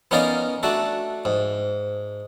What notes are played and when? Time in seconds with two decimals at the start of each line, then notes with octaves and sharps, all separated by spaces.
0.11 B3 C#4 D#4 A#4 D5 F5
0.63 A3 D4 F#4 A4
1.25 G#2